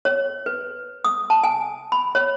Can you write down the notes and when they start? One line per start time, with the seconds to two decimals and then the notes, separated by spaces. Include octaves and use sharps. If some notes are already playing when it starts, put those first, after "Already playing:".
0.05 C#5
0.46 B4
1.05 D#6
1.30 A5
1.44 G#5
1.92 B5
2.15 C#5